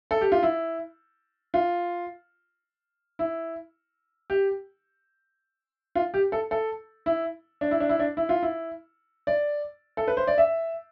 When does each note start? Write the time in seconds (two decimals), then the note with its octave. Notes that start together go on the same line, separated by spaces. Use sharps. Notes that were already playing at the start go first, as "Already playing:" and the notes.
0.11 A4
0.21 G4
0.32 F4
0.43 E4
1.54 F4
3.19 E4
4.30 G4
5.95 F4
6.14 G4
6.32 A4
6.51 A4
7.06 E4
7.61 D4
7.71 E4
7.80 D4
7.89 E4
7.99 D4
8.17 E4
8.29 F4
8.43 E4
9.27 D5
9.97 A4
10.08 B4
10.17 C5
10.27 D5
10.38 E5